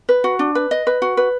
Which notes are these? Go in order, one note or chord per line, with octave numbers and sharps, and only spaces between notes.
B4
F#4
D4
B4
D#5
B4
F#4
B4